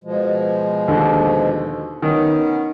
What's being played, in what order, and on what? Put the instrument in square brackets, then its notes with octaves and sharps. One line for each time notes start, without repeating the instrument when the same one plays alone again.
[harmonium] B2 F3 G#3
[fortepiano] D#2 D3
[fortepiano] D#3 [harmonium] B3 C#4